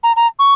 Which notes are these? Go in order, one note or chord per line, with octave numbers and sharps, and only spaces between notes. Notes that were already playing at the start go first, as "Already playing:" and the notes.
A#5
A#5
C#6